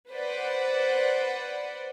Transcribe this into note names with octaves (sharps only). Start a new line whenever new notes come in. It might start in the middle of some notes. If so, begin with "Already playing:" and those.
B4 C5 D5 F#5